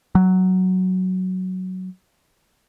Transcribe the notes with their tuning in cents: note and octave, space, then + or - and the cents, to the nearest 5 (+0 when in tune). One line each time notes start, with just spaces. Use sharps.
F#3 +5